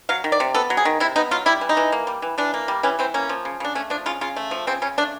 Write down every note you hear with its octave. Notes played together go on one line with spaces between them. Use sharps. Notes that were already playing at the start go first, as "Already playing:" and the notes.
F#3 F5
D#3
D5
C3
B3 A4
F#3
G#4
D#3
C3 E4
B3 D#4
F#3 F4
G3 E4
E3
D#4
E3
A#3
G3
E3
E3 D4
A#3
G3
E3 C#4
E3 C4
A#3 C#4
F3
C#3
C#3 D4
A3 C#4
F3 D4
C#3 F4
C#3 F4
A3
F3
C#3 C4
C#3 C#4
A3 D4